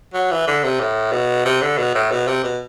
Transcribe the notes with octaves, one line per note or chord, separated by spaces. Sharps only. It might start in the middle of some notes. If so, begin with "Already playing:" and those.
F#3
E3
D3
C3
A2
B2
C3
D3
B2
A2
B2
C3
B2